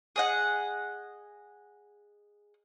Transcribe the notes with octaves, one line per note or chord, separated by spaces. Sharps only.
G#4 D#5 F#5